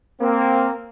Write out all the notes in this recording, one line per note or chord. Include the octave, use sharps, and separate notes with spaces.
A#3 C4